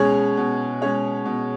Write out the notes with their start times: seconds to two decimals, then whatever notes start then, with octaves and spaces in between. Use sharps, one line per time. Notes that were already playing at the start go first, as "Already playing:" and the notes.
Already playing: B2 G#3 C#4 G#4 C#5
0.37 B2
0.82 G#3 C#4 G#4 C#5
1.25 B2